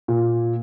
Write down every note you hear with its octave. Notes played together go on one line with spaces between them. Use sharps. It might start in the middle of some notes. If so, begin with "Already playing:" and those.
A#2